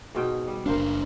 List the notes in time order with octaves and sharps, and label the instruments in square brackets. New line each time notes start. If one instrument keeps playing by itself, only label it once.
[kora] G#2 B2 G5
G3
[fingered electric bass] F#1 D4 [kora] A#4 C5 F5